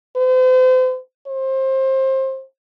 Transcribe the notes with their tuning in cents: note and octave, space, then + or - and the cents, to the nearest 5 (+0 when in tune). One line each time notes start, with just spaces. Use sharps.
C5 -40
C5 +25